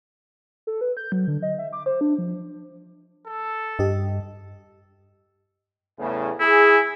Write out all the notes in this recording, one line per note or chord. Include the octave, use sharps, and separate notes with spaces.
A4
B4
G6
F#3
D3
D#5
E5
D6
C5
D4
F3
A4
G2 G4 D#5
E2 A2 C#3
E4 G#4